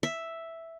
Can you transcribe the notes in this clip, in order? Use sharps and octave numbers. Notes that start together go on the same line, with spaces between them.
E5